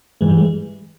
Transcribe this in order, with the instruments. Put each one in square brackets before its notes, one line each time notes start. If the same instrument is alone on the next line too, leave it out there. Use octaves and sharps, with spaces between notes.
[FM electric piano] G#2 G#3 [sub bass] E3
[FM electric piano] G2 G3
G#3